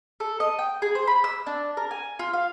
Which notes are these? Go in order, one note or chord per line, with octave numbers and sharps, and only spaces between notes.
A4
D#5
G5
G#4
C5
B5
E6
D4
A#4
G#5
F4
F5